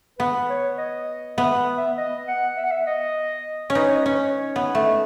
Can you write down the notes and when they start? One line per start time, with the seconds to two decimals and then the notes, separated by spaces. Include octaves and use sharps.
0.18 B3 B4
0.49 C#5
0.78 D#5
1.38 B3 E5
1.77 E5
1.98 D#5
2.28 F#5
2.57 E5
2.64 F#5
2.71 E5
2.86 D#5
3.70 C#4
3.75 D#4 B4
3.87 C#5
3.95 D#5
4.06 C#4 B4
4.16 C#5
4.56 B3
4.75 A3
4.85 D#5